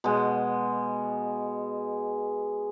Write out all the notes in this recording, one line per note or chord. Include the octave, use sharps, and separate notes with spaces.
B2 G#3